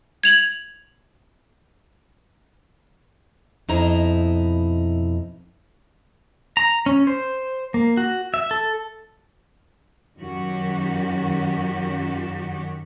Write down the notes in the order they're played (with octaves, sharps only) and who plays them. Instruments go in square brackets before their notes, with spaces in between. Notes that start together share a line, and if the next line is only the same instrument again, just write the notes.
[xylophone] G#6 F7 F#7
[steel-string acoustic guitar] F2 B2 D#4 E4 A#5
[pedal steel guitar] A#5
C#4
C5
A#3
F#4
E5
A4
[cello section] F#2 D#3 C#4 F#4 G4